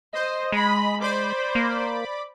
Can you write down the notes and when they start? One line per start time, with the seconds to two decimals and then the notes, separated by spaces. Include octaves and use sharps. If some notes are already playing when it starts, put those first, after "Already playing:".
0.13 C5 D#5
0.52 G#3 B5
1.01 C5 D5 B5 D6
1.55 A#3